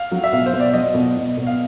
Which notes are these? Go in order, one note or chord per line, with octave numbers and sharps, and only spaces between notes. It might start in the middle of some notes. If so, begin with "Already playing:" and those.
Already playing: F5
F#3
E5
B2 F5
C5
B2
D5
F#3 D#5
B2
B2
B2
F5